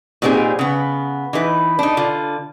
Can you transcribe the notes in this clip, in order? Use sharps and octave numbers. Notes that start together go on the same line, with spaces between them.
A#2 G3 B3 C4 D#4 G#4
C#3 B3
E3 D#4 B4
D4 D#4
D3 F4